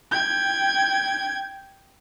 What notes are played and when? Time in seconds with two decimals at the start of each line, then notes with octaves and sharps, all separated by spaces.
0.12 G5 G#6